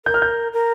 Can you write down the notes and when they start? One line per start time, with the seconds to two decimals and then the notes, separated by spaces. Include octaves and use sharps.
0.06 A#4 G6
0.14 F6
0.22 G6
0.53 A#4